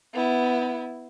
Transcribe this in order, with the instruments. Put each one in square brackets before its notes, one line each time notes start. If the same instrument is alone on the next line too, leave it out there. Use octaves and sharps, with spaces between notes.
[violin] B3 E4